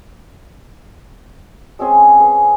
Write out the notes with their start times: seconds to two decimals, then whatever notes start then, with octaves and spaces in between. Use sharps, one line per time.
1.79 G#3 C4 C#4 G#4
2.20 G#4 B4